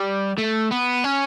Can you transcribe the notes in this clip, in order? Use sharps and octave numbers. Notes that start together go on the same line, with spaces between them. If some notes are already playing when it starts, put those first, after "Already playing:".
Already playing: G3
A3
B3
C#4